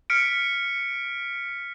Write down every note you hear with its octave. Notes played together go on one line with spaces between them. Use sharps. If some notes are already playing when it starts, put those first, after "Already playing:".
F6 B6 C#7 D7